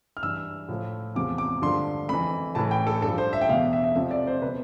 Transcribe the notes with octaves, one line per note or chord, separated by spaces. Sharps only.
F6
G2 E3 E6
A2 F3
E2 C3 F3 D6
D6
G2 D3 F3 C6
F2 E3 B5
A2 E3 A5
G5
A4
G2 A4
F3
C5
E5
G5
E2 B2 F5
E5
E5
F2 C3 F3 E5
D5
C5
B2 B4